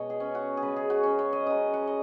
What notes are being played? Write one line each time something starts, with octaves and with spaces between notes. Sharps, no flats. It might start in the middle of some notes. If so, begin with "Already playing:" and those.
Already playing: B2 G#3 C#5 D#5
G#4
C#4
F#4
G#4
C#3 G#3 B4
G#4
F#4
C#4
C#5
D#5
C#3 F#3 D#5
F#5
D#5